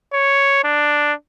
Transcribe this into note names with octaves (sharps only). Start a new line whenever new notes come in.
C#5
D4